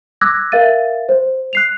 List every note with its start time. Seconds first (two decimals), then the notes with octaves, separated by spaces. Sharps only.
0.21 D6 E6 F#6 G#6 A#6
0.52 A#4 E5 F5 A6 D#7
1.09 C5
1.53 F#6 C7 F7